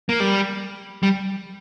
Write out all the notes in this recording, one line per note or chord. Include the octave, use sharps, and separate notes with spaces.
A#3
G3
G3